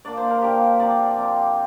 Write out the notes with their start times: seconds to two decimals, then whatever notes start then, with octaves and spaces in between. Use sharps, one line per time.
0.05 A#2 A#3 D4 D5
0.17 C5
0.30 A#4
0.42 A#2 A#3 D4 G4
0.79 C3 F3 C4 D5
1.16 C3 F3 C4